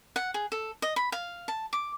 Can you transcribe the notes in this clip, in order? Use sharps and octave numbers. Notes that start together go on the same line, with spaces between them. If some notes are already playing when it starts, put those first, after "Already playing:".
F#5
G#4
A4
D#5
B5
F5
A5
D6